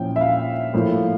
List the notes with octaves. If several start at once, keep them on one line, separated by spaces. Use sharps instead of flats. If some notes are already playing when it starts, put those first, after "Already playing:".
Already playing: A#2 F3 C#4 E4 G5
E5
F5
A2 F3 A#3 E4